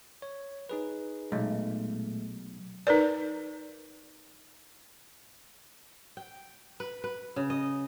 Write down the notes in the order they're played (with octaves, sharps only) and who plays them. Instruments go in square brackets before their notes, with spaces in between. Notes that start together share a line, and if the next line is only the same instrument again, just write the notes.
[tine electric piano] C#5
D#4 G#4 B4
[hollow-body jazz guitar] B1 [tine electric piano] A#2 G#3 A3
[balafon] D#4 A#4 B4 D5
[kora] G5
B4
B4
C#3
D#5